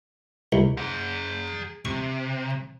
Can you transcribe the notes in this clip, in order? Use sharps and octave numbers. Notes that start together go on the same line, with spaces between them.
C2
G#4 F#5
C3 C#6